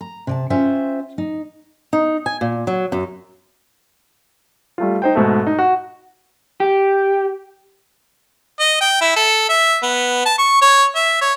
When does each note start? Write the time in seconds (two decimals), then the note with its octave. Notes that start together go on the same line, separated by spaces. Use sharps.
0.01 A#5
0.27 C3 D5 A5
0.50 C#4 F4 C5 E5 G5
1.18 D#4
1.93 D#4
2.26 G#5
2.41 A#2
2.67 F#3
2.92 F#2
4.78 G3 A3 F4
5.02 D#4 C5 G5
5.15 G#2 B2 A3
5.47 D#4
5.59 F#4
6.60 G4
8.60 D#5
8.81 G5
9.01 E4
9.16 A4
9.49 E5
9.83 B3
10.25 A5
10.38 C#6
10.62 C#5
10.95 E5
11.21 C#5